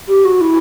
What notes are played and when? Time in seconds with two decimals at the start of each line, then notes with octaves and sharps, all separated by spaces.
0.08 G4
0.25 F#4
0.41 E4